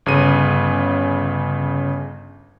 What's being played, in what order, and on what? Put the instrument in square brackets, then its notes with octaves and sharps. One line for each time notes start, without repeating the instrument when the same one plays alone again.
[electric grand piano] G1 C#3 D#7